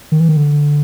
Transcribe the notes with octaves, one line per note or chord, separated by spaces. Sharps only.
D#3
E3
D#3
D3